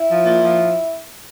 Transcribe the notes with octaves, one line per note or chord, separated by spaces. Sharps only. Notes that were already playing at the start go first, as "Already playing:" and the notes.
Already playing: E4
F3
A#2
F3